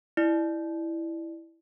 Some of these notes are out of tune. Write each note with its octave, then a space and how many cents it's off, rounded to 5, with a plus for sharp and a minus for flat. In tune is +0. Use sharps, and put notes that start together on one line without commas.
E4 +0 D5 +25